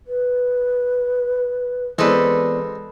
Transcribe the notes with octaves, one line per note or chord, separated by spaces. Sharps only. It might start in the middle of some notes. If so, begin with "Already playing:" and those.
B4
E3 G#3 B3 C4 A4 B4 D5